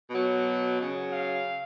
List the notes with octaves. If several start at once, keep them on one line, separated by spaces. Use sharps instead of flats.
B2 F#3
C#3 F#3
F5